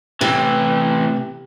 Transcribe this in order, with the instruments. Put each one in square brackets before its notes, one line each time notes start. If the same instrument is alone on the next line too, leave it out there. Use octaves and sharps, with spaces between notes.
[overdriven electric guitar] A2 E3 [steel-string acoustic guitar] C3